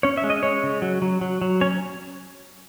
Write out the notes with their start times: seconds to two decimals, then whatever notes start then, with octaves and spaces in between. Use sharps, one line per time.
0.03 C#4 C#5
0.17 E5
0.24 G#3
0.30 D#5
0.43 G#3 C#5
0.63 C#3
0.82 F#3
1.02 F#3
1.21 F#3
1.42 F#3
1.61 C#4 C#5